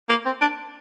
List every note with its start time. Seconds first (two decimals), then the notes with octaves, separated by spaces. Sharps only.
0.09 A#3
0.25 C4
0.41 D4